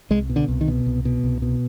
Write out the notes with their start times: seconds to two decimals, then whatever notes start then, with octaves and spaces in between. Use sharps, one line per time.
0.10 C2 G#3
0.29 B2
0.36 D3
0.48 C2
0.61 D#3
0.68 B2
0.86 C2
1.05 B2
1.24 C2
1.42 B2